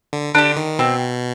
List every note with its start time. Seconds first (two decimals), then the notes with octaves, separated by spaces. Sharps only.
0.13 D3
0.34 D3 D4 G4
0.56 D#3
0.79 B2 C4